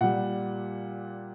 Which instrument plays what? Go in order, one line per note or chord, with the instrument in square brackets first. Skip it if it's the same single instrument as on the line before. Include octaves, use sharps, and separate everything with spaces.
[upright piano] A#2 G3 F#5